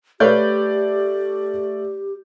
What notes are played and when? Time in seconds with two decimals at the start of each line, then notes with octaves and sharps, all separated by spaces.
0.20 A3 G4 B4 C#5 D5 F5 G6